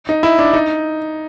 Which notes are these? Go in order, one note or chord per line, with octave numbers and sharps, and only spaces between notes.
D#4
E4
D4
D#4